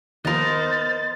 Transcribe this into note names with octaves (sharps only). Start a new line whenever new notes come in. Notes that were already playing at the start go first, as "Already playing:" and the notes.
D#2 F3 B3 A#4 C5 D#5 A6